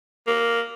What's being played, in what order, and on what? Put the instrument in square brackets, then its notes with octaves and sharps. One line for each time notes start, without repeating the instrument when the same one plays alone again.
[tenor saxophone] A#3